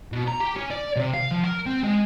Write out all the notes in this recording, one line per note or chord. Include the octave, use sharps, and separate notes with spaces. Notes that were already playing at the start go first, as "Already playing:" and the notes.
B2
A#5
G4
C#4
D5
C3
F5
F3
A#4
C4
G#3